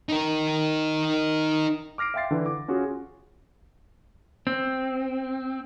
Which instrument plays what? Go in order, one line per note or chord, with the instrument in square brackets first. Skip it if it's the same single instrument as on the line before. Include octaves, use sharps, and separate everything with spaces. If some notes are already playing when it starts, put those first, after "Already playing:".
[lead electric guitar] D#4 A#4
[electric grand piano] D6 F6 A#6 C7 D7
E5 F5 G5 C6 A6 C7
D3 E3
D6
C#4 F4 F#4 G#4
[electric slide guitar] C4